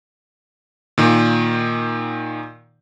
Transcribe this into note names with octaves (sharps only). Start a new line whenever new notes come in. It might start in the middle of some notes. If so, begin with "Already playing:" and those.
A#2 D#3